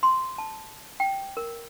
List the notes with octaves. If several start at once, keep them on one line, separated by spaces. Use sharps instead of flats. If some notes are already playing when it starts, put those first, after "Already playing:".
C6
A5
G5
A#4